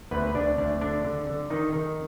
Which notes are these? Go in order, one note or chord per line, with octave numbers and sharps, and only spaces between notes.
D2 B3 B4
B4
D2 D4 D5
D2 D4 D5
D3 D4 D5
D3
D3
D#3 D#4 D#5
D#3